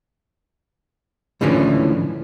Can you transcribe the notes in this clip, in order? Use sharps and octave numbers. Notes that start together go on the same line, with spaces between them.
C#2 A2 D3 E3 F3 C#4